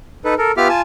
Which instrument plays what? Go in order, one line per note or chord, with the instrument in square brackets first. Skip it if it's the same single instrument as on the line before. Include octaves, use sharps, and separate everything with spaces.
[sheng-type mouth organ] D#4 A4 B4
A4 A#4
B3 F4 G4 E5 D6 F6
F4 G#5 A5